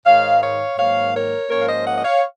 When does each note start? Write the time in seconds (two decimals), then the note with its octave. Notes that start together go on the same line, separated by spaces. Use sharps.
0.05 G#2 D#3 G#3 D#4 C#5 F5
0.42 C#5 F5
0.78 G#2 D#3 F#3 A#3 C#5 F5
1.14 A#4 C#5
1.50 G#2 F3 A#3 C#4 A#4 C#5
1.61 F5
1.68 C5 D#5
1.86 D#5 F#5
1.96 D#5
2.04 C#5 F5